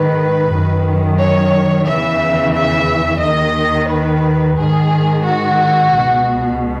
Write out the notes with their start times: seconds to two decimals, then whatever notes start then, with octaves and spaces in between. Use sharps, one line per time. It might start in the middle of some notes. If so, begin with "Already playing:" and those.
Already playing: G#2 D#3 B4
0.51 F#2 D#3
1.19 C#5
1.86 E2 C#3 E3 E5
2.54 E5
3.21 D#2 D#3 D#5
3.89 B4
4.56 G#2 D#3 G#4
5.24 F#4
5.92 C#2 B2